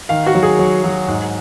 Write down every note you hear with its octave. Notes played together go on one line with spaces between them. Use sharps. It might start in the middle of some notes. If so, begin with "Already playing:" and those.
D#3 F5
F#4
F#3
G#4
F#3
F#3
G#2